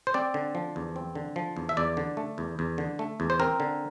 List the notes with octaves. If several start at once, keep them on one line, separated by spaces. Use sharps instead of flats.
C5
C4 D5
D3
F3
E2
C4
D3
F3
E2
E5
E2 D5
D3
A3
E2
E2
D3
A3
E2
C5
C4 A#4
D3